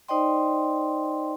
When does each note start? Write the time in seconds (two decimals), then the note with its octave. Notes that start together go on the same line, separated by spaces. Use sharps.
0.08 D#4 C5 D5 D#5 G5 C6